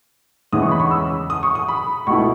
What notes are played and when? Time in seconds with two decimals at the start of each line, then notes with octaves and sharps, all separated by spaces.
0.53 E2 C#3 E3 G#3 C#4 D#6
0.62 C#6
0.71 B5
0.80 C#6
0.91 E6
1.30 D#6
1.43 C#6
1.55 D#6
1.69 B5
2.07 C#2 B2 A3 E4 C#6